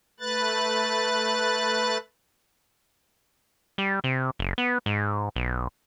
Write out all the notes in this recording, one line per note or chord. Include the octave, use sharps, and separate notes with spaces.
A3 B4 F#6 A6
G3
C3
F#1
B3
G#2
B1